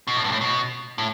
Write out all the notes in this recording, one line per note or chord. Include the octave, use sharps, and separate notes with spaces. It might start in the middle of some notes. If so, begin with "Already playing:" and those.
B2
A2
G2
A2
B2
A2